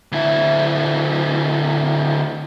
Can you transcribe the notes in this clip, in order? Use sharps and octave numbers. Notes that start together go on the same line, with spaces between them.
D2 E4